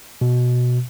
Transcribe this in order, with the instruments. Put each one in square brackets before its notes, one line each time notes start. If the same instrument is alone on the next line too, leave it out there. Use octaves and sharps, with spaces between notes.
[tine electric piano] B2